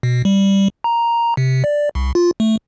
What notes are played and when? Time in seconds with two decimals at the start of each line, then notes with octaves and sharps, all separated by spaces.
0.03 B2
0.25 G3
0.84 A#5
1.37 C3
1.64 D5
1.95 C2
2.15 F4
2.40 A3